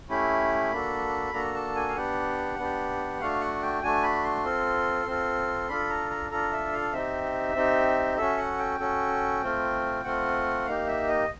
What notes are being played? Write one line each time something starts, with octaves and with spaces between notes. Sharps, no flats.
A3 C#4 E4 G4 B5
A#3 D4 F#4 A4
A#3 D4 F#4 A4 A#5
A5
G#5
F5
B3 D4 G4 F#5
B3 D4 G4
A3 D4 F#4 F5
F#5
G5
A3 D4 F#4 G#5
B5
C6
C4 F4 A4
C4 F4 A4
D4 F4 A4 B5
A#5
A#5
D4 F4 A4 A#5
E5
F5
C4 D#4 G4 E5
C4 D#4 G4
C#4 F#4 A4 E5
F#5
G5
C#4 F#4 A4
A3 C4 F4
A3 C4 F4 F#5
A#3 D#4 G4 F5
E5
D#5